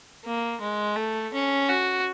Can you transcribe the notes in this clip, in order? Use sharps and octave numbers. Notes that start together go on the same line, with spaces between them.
A#3
G#3
A3
C#4
F#4